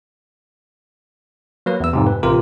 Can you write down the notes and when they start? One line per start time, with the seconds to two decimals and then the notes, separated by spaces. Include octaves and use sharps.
1.66 F#3 A#3 B4
1.80 E2 E6
1.93 F2 G#2 C3
2.07 B4
2.23 A1 C3 F4 A#4